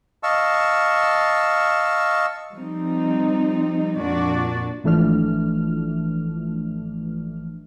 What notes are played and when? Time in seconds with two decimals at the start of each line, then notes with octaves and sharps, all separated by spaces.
0.23 D#5 F5 A5 C#6 E6
2.53 F3 G3 C4 D#4
3.98 F2 A#2 D4 F#4 D5
4.84 G#1 E3 F3 A3 D4 F6